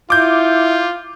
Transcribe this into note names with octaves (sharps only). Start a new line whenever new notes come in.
E4 F4 D6 G6